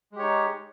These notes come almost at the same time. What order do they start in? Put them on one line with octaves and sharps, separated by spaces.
G#3 G4 C#5 D#4